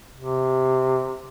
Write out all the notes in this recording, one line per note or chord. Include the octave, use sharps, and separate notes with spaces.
C3